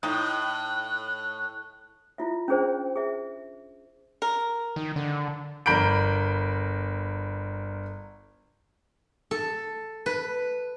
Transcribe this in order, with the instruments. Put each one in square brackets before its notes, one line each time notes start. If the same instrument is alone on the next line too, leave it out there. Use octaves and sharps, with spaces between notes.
[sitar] A2 [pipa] D#4 G5 [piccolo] F#6
[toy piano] E4 F4 E5
C#4 D4 G#4 C5
G#4 E5
[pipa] A#4
[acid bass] D#3
D3
[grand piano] G1 A#4 B5 G6 D7
[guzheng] A4
B4